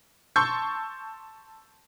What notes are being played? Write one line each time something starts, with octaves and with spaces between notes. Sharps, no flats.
A5 C6 C#6 E6 G6